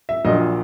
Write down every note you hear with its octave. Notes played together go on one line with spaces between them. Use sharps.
E5
A#1 A#2 F#3 D#5